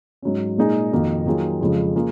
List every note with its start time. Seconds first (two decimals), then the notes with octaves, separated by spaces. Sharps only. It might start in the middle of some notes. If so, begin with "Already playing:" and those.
0.22 G#2 F#3 C#4
0.57 A#2 G#3 D#4 G#4
0.92 F2 D#3 A#3 D#4 F#4
1.26 D#3 F#3 A#3 F4 G#4
1.61 F2 C#3 F3 G#3
1.96 A#3 F4 G#4